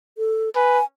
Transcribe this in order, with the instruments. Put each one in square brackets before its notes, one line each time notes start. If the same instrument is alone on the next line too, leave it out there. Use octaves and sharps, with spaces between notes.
[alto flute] A4
[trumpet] B4 [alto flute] G#5